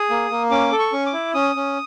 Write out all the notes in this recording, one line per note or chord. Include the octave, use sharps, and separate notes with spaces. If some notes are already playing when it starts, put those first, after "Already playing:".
Already playing: G#4 D#6
A#3
A#3
C#4 D6
A4
C#6
C#4
D6
E4
C#4 D#6
C#4